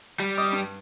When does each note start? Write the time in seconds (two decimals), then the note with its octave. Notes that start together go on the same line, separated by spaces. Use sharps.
0.20 G3
0.38 D#5 D6 D#6
0.53 G2